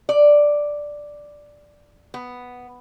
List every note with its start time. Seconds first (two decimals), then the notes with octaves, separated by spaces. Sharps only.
0.09 D5
2.14 B3